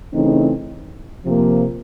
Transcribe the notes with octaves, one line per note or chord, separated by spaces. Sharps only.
C#3 E3 A3 C4 D#4
C3 F3 A#3